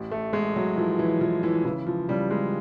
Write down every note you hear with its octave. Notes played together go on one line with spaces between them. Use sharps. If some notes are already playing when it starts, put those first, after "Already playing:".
Already playing: A1
A3
A1 G#3
F#3
E3 F3
E3
E3 F3
E3
C#3 E3
F3
C#3 G3
G#3